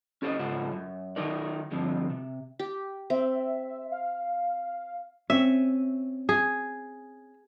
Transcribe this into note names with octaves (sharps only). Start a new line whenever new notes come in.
C#4 G4 A4 C5 D5 D#5
G#2 C#3 F4 A4 C5 F#5
F#2
D#3 F#3 D#4 A#4 D5
D2 G2 D3 F3 C4
C3
G4
C4 E5
F5
C4 C#4 E5
G#4